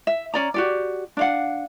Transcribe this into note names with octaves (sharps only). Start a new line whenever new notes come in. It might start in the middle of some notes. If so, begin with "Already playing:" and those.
E5
C#4 D5 A#5
F#4 G4 D5
D4 F5 F#5